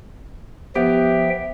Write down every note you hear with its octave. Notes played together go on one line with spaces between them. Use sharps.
F3 B3 G4 E5 G5